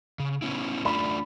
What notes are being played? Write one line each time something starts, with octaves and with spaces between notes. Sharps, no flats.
C#3
B3 C#4 E4
A3 D4 F4 D5 B5